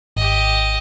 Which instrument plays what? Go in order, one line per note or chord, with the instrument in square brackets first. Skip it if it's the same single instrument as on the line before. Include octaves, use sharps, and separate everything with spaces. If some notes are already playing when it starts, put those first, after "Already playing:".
[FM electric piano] G#1 [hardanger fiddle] G4 D#5